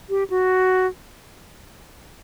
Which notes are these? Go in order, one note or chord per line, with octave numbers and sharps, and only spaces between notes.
G4
F#4